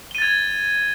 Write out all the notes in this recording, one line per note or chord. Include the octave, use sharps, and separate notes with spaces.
G#6 A6 D#7 G7